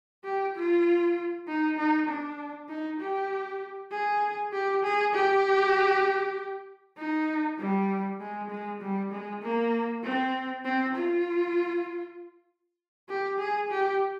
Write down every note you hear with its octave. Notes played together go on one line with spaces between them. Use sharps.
G4
F4
D#4
D#4
D4
D#4
G4
G#4
G4
G#4
G4
D#4
G3
G#3
G#3
G3
G#3
A#3
C4
C4
F4
G4
G#4
G4